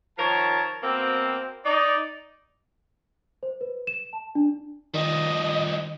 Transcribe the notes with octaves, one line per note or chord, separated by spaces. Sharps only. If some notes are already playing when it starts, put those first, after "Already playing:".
D#3 F3 A#4 C#5 A5
B2 A#3 C4
D#4 D5
C5
B4
E7
A5
D4
D#3 F3 G3 D#5